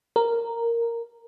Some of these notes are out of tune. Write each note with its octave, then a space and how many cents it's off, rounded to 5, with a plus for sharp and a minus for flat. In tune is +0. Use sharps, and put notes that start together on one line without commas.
A#4 -5